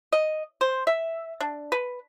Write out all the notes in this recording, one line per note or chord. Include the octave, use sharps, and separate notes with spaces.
D#5
C5
E5
D4
B4